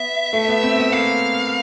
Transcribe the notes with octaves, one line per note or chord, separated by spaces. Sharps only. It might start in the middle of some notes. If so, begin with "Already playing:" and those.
Already playing: B3 E5
A3
B3
C4
B3
A#3 F5